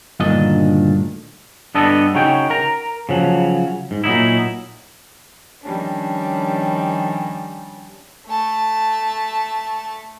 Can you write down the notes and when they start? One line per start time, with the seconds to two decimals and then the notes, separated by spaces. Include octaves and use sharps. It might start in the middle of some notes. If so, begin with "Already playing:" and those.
0.20 D2 G2 A#2 D#3 D4 D#5
1.75 G2 B3 D4 A4 D#5
2.14 C#3 D#4 F#4 C#5 G5
2.50 A#4 A#5
3.09 C#3 F3 F#3
3.91 G#2
4.04 A#2 F#3 D#4 E4
5.61 D#3 F3 G3 C#4 D4
8.27 A3 A5